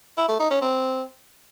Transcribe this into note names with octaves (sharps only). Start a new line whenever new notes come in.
E4
A3
D#4
C#4
C4